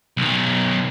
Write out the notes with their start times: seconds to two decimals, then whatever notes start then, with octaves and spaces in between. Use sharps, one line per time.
0.17 B1 D#3